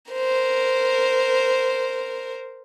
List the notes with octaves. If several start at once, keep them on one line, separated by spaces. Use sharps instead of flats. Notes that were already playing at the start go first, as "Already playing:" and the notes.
A#4 C5